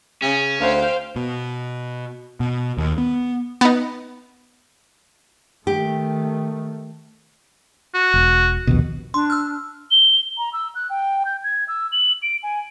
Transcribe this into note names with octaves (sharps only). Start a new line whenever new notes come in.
C#3 C#4
D2 C5 F5 G5
B2
B2
D#2
B3
B3 D#4
D#3 A3 G4
F#4
E1
A#1 D#2 B2
D4 C6
E6 F6
G7
A#5
E6
F#6
G5
G6
G#6
E6
F#7
D7
G#5